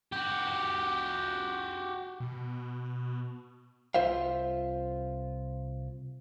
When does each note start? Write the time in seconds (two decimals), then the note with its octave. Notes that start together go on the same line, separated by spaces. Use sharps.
0.12 F#4 G4
2.20 B2
3.94 C2 F4 C5 E5 F5